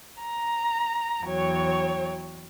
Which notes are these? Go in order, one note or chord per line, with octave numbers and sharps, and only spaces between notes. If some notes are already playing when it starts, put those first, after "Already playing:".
A#5
E2 F#3 C#5 G5